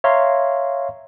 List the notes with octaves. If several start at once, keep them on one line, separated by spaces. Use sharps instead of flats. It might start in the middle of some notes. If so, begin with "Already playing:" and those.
C#5 E5 F5 A#5 C6